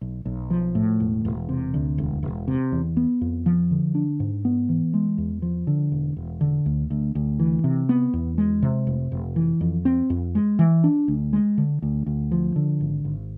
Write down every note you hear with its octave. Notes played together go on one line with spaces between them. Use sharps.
B1
B1
F3
A2
E1
E1
C3
D2
E1
E1
C3
E2
B3
F2
F3
D3
D4
G#2
B3
E3
G#3
E2
F3
D3
E1
E1
D3
D2
D2
D2
E3
C3
B3
E2
G#3
C3
F1
F1
E3
F2
C4
F2
G#3
E3
D4
D2
G#3
D3
D2
D2
F3
D3
G#1
G#1